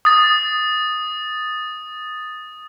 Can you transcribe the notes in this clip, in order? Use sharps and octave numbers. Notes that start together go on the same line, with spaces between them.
D#6 A6